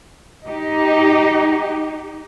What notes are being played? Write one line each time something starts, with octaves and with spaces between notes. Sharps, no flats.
D#4 G4